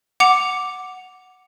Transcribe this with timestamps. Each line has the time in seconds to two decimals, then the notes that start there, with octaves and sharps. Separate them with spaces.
0.20 F#5 D6 C#7 F7